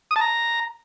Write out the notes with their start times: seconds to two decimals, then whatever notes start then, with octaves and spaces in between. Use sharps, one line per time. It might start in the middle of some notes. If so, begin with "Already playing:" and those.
0.11 D#6
0.16 A5
0.21 A#5